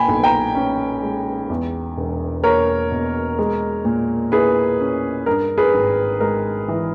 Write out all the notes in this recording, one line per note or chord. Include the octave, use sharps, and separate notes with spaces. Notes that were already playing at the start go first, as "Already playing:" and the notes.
Already playing: A#2 G5 G#5 B5
B1
G5 A#5
C#4
G#3
E2
E1
A#3 A#4 C#5
B2
G#3
A#2
E4 G#4 B4
C#4
G2 A#4
G#4 B4
G#1
G#3 A#4
E3